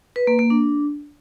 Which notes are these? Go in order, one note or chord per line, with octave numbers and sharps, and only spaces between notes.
B4
A#3
A#3
D4